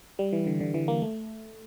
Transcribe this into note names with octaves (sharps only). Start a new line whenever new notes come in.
G3
E3
D3
D3
E3
A#3
A3